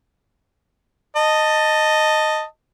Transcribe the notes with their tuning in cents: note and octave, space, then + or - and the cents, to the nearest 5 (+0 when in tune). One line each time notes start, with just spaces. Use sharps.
D#5 -5 A5 +10